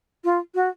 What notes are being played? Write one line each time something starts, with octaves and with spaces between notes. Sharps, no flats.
F4
F#4